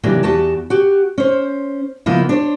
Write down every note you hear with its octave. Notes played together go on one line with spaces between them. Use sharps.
C3 E3 F#3 G3 A#3 D4
E2 F#4 G4 A5
F#4 G4
C#4 C5
C#3 F3 A#3 B3 D#4 E4
D4 C5 C#5